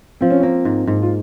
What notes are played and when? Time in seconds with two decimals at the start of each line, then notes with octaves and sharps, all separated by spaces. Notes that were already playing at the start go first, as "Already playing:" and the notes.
0.21 F3 C4
0.30 C#4
0.40 A#3 C4
0.65 G#2
0.87 G#2
1.03 F4